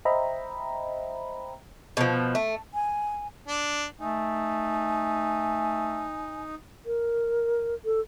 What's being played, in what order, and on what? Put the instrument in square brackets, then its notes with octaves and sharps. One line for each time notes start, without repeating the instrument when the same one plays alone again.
[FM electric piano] C5 D#5 E5 G5 A#5 B5
[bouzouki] B2 F3
A3
[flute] G#5
[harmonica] D4
[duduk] A3 [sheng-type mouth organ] D#4 [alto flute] G#5
[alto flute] A#4
A4